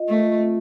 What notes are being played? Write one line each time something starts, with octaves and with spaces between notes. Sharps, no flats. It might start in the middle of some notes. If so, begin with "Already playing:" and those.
Already playing: F4 D#5
A3 A#4
F4
C4